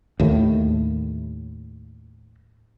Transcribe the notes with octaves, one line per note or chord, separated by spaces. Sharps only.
D#2 A2